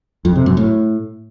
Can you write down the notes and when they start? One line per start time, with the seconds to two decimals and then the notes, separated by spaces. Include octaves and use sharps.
0.25 F2
0.36 C3
0.46 F#2
0.57 A2